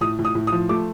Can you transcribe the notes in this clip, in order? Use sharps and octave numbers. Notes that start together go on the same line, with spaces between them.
A2 D#6
A2
D#6
A2
D#6
F3
A3 D6